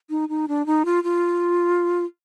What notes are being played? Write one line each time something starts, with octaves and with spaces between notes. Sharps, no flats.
D#4
D#4
D4
D#4
F4
F4